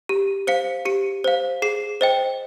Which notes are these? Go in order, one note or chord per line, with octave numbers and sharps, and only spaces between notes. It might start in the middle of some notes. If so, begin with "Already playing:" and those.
G4
C5 F5 C#7
G4 C#7
C5 F5
G#4 C7
C5 D#5 G5